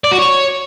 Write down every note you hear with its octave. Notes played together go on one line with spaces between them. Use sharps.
D5
F#4
C#5